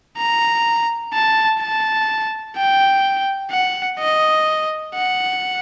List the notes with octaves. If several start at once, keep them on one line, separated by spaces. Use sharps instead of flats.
A#5
A5
A5
G5
F#5
D#5
F#5